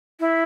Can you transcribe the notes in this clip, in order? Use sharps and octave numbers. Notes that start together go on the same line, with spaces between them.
E4